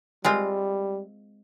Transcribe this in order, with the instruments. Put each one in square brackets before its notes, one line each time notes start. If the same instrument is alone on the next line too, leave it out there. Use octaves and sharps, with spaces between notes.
[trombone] G3 [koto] G#3 C4 F4